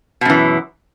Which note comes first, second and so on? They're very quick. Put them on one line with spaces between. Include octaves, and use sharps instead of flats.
B2 F#2 E3